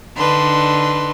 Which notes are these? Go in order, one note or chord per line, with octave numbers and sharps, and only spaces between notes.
D3 D4 D#4 B4 C6